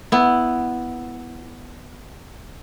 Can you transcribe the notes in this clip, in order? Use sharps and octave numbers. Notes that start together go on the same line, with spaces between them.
B3 E4